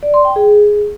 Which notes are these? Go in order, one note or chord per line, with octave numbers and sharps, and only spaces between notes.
D5
C6
G5
G#4